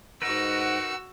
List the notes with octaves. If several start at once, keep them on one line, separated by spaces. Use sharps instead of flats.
G#2 D#4 F#4 A#4 B4 F#5 E6